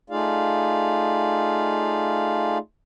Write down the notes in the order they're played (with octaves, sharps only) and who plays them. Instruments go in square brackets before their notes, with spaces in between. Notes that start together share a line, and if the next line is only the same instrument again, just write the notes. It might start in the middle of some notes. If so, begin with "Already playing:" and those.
[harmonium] A3 D#4 F4 G#4 D5 F5